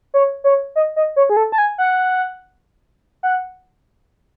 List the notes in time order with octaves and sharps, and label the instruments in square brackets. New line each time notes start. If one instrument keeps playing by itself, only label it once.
[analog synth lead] C#5
C#5
D#5
D#5
C#5
G#4
A4
A5
G#5
F#5
F#5